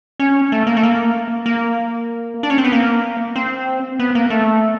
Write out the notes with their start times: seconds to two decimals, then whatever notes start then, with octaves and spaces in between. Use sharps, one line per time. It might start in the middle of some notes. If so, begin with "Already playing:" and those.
0.20 C#4
0.52 A3
0.67 A#3
0.77 A3
0.83 A#3
1.46 A#3
2.43 D4
2.50 C#4
2.58 C4
2.64 B3
2.72 A#3
3.36 C4
3.99 B3
4.15 A#3
4.30 A3